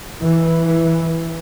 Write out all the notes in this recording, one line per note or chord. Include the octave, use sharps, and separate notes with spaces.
E3